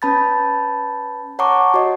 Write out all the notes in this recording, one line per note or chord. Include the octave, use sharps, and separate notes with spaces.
C#4 B4 A5 B5 G6 A6
C#5 F#5 A5 A#5 C#6 D6
F#4 C#5 D#5